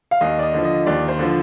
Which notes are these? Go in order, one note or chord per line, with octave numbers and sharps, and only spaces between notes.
F5
D#2 D#5
D5
D#5
D3 F3
D#5
D#2 D5
C5
D3 F3